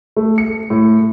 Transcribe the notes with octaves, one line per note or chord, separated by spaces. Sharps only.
A3
C#7
A2